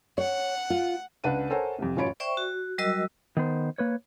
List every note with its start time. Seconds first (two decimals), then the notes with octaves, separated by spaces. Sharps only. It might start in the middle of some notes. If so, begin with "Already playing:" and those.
0.18 C#5 F#5
0.70 F4
1.24 C#2 D4 B4 F#5 D#7
1.50 A4 A#4 C5 C#5 F#5 G#5
1.79 C2 F2
1.96 A1 F#2 F4 C#5 B5 D7
2.20 C5 D5 E5 G5 C#6
2.37 F#4
2.78 F#3 G3 F#4 A#4 D#5 E6
3.37 D#3 B3 C5
3.78 A#3 B4 C#5